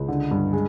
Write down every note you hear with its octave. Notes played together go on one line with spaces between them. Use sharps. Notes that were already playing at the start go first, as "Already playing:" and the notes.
Already playing: C#2
D3
G2
G#3